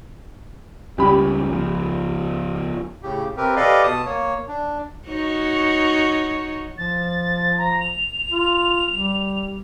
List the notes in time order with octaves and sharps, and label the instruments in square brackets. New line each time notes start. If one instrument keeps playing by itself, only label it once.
[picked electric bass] C#2 G3 C#4 [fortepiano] G4 B5
[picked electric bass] C#2 F3
[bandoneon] A2 C#3 G4
C3 C4 G4 A#4 B4
G4 A4 B4 D5 D#5 F5
B2 A5 D#6
A#3 C#5
D4
[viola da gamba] D#4 F#4 C#5
[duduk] F3 [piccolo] A6
[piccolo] A#5
F7
[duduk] F4
G3